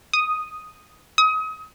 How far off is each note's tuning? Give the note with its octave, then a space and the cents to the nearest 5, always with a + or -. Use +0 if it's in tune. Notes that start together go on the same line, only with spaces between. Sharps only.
D#6 +0
D#6 +30